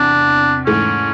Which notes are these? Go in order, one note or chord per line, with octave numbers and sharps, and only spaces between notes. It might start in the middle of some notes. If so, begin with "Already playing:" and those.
Already playing: E2 C3 D4
G#2 E3 A3 C#4